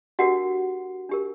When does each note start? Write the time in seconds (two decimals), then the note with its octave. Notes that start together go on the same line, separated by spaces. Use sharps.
0.19 D4 F#4 G4 A#4 F#5
1.09 D4 G4 A#4